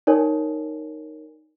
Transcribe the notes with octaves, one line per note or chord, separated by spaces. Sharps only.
D#4 A#4 C#5 D5 G#5